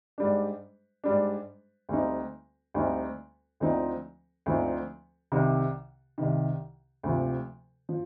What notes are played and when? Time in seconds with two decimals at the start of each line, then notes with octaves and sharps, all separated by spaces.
0.18 G#2 G3 D4
1.04 G#2 G3 D4
1.89 D2 D3 G3 C4 D#4
2.74 D2 D3 G3 C4 D#4
3.60 D2 D3 F3 C4 D#4
4.46 D2 D3 F3 C4 D#4
5.32 C2 C3 D#3
6.18 C2 C3 D#3
7.03 D2 C3 F3
7.89 F3